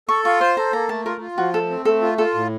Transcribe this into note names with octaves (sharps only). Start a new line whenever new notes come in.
A4 C#6
F4 C#6
C5 C6
A4 A#5
A#3 A#5
A3 A5
F4 A#4
F4
F3 F#4
A3 A4
C4
A3 A4
F4
F4 A4
A2